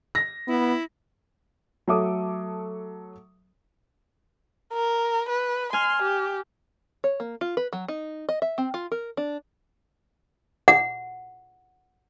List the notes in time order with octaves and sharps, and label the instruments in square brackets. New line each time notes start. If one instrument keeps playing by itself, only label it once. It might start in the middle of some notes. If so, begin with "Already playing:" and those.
[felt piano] A#6
[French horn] B3 [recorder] E4
[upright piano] F#3 A3 A4 E5 D6 D#6
[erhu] A#4
B4
[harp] G#5 F6 [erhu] C6
[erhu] G4
[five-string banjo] C#5
A#3
F4
B4
F#3
D#4
D#5
E5
C4
F4
A#4
D4
[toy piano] F#5